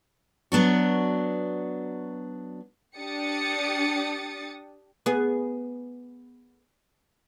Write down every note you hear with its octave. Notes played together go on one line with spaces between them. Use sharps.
F#3 B3 D4 F#4
D4 G4 D#6 A6 C#7
B3 G#4